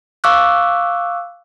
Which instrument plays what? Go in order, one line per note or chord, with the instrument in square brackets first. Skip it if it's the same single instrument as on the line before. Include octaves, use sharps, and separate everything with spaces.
[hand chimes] F5 C#6 D6 E6 F#6